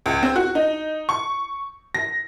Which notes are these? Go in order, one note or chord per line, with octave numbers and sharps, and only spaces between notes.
C#2
C4
F#4
D#4
C#6
A#6